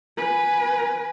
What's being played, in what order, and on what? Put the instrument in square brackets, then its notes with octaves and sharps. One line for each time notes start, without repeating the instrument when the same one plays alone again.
[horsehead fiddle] B4 G#5